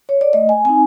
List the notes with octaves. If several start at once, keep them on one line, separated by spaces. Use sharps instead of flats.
C#5
D5
A3 D#5
G#5
C4 D#4 G#5